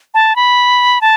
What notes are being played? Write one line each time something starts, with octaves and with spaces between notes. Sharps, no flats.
A5
B5
A5